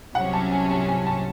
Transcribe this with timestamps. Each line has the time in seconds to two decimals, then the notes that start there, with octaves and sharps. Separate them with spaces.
0.15 C2 C3 F#3 C#4 F#5
0.33 A5
0.52 G#5
0.71 A5
0.88 G#5
1.07 A5